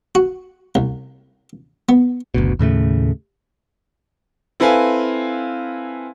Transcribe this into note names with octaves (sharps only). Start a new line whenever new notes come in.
F#4
C2
B3
F#1 D2 B2
D#2 A2 C#3 A3
C4 E4 A4 B4 F5 G#5